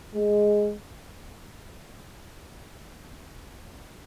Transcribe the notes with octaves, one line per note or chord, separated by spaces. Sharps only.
G#3